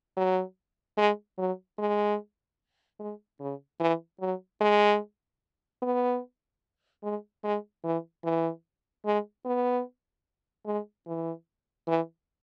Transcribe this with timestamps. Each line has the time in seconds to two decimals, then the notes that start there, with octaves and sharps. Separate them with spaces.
0.17 F#3
0.98 G#3
1.38 F#3
1.78 G#3
3.00 G#3
3.40 C#3
3.80 E3
4.21 F#3
4.61 G#3
5.82 B3
7.03 G#3
7.44 G#3
7.84 E3
8.24 E3
9.05 G#3
9.45 B3
10.66 G#3
11.07 E3
11.87 E3